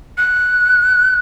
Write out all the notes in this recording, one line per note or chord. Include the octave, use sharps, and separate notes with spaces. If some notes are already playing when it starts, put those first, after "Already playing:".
F#6